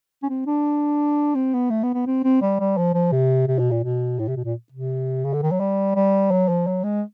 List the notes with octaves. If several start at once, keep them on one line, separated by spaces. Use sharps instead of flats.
C#4
C4
D4
C4
B3
A3
B3
B3
C4
C4
G3
G3
F3
F3
C3
C3
B2
A#2
B2
A2
C3
B2
A#2
C3
C#3
D3
D#3
F#3
G3
G3
F#3
F3
F#3
G#3